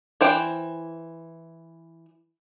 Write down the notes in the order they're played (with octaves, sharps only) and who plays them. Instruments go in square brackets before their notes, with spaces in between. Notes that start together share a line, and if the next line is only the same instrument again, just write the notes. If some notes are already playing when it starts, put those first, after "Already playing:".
[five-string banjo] E3 C5 G5